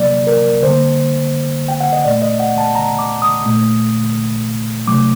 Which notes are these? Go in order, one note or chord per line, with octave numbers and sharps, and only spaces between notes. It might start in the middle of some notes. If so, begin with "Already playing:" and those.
Already playing: C3 F#3 A#3 D5
A#4
D3 G3 A#3 C5
G5
F#5
D#5
A#2 A3 D5
D#5
F#5
A5
A#5
D6
D#6
A#2 A3
C3 F#3 A3 D6